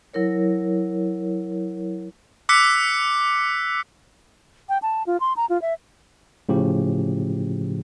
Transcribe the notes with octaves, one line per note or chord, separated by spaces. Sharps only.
F#3 E4 A#4 C#5
D6 E6 F#6 B6 C#7
G5
A5
F4
C6
A#5
F4
E5
A2 C#3 F3 G4